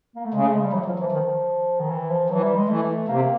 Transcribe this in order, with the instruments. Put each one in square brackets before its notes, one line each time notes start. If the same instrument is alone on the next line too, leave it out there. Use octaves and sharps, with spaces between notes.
[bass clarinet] A#3
A3
[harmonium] C#3 [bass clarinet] G#3
[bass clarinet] A3
G#3
G3
[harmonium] E3 [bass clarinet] F#3
[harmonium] F3 [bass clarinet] F#3
[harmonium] E3 [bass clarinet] F3
[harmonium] D#3
[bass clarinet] D#3
E3
F3
[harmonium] E3 [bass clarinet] F#3
[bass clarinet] G3
G#3
[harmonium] E3 [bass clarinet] A3
[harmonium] C3 [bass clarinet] A#3